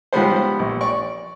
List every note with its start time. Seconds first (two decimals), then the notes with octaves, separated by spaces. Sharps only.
0.13 G#2 F3 G3 B3 C5
0.59 A#1
0.81 D5 C#6